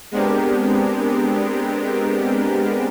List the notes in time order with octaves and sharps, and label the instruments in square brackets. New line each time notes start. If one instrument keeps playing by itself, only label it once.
[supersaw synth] G#3 B3 C4 D4 G4 A#4